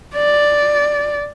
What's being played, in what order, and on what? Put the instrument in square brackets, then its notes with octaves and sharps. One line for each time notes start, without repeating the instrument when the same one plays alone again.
[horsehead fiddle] D5